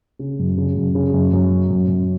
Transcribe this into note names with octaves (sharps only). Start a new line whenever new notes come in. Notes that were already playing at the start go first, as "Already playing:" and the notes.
C#3
F#2
C#3
F#2
C#3
F#2
F#2
F#3
F#2
F#2